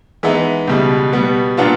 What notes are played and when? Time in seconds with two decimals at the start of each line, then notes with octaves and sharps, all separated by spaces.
0.23 E3 G#3 B3 D#4
0.68 C#2 B2 G3
1.13 B2 G3 B3
1.57 A#2 F#3 B3 D4 F4